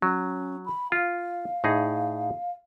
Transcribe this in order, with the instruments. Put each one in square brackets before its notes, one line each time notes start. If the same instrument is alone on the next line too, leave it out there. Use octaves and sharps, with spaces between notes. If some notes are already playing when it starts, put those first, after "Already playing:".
[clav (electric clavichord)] F#3 [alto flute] C#4
[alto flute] B5
[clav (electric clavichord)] F4 [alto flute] F5
[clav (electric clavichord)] A2 D#4 G#4